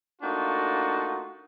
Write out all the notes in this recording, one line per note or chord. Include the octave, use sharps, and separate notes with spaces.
A3 A#3 D4 D#4 F4 F#4